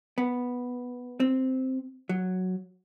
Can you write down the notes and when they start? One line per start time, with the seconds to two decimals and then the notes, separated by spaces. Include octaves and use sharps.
0.18 B3
1.20 C4
2.09 F#3